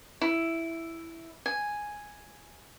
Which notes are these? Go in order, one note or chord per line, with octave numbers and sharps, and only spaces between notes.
E4
G#5